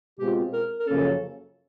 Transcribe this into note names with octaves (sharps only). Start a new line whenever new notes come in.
B2 G#3 C4 F4 G4
A#4
A#4
F#2 C#3 F3 A#3 C#4 A4